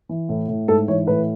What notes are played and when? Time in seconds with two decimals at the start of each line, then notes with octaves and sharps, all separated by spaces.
0.09 E3
0.29 A2
0.48 A2
0.68 G#2 A4
0.88 E3 C#5
1.07 A2 B4